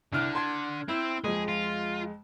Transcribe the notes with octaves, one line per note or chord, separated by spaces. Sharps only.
C2 D3 F6 F#6
A5 C6 G#6
C4 E4
F2 G#3 G#4
F4